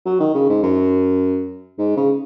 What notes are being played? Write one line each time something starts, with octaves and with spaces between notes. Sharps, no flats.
F#3
D#3
C#3
G#2
F#2
G#2
C#3